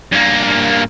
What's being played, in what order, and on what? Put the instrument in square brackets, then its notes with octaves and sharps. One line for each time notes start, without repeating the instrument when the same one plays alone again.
[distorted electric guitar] G2 A#3